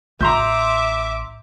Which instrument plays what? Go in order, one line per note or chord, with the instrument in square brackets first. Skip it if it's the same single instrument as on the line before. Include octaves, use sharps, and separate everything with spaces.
[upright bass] A1 [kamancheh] E5 D6 [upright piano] A#5 C6 G6